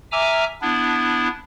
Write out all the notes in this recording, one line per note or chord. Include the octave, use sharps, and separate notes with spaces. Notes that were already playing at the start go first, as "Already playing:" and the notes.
E5 G#5 A#5 D6 E6 F6
B3 D4 E4